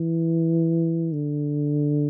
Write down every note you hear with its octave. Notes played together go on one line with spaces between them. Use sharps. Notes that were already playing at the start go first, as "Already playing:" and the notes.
Already playing: E3
D3